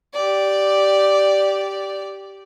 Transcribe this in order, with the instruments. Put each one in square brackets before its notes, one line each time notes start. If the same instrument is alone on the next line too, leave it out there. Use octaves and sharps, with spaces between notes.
[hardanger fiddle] G4 D5